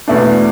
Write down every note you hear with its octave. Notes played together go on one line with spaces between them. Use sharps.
E2 B2 A3 D4